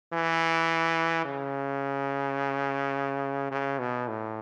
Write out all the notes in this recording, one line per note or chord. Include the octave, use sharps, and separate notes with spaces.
E3
C#3
C#3
B2
A2